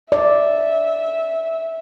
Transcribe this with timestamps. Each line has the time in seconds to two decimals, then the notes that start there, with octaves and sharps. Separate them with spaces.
0.12 D5 E5